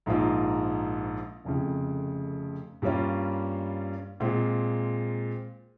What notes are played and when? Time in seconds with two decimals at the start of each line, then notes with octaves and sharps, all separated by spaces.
0.06 A#1 G#2 F3 A#3 F4
1.45 F1 F2 C#3
2.82 G2 G3 A#3 C#4 F4
4.20 A#2 G#3 C4 F4